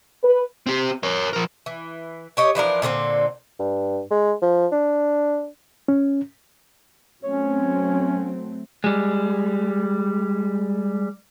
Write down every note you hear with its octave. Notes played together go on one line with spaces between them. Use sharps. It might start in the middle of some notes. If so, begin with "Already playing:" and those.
B4
C4 G4
A#4 C#5
F3 A#4
E3
G4 C#5 D#5
E3 F3 D4 A#4
A#2 D3 A#3 C4
G2
G#3
F3
D4
C#4
F#3 A3 C4 C#4 C#5
G3 G#3